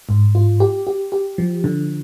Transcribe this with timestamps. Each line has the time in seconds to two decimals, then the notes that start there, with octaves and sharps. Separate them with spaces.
0.09 G#2
0.35 F4
0.60 G4
0.87 G4
1.12 G4
1.38 F3
1.64 D3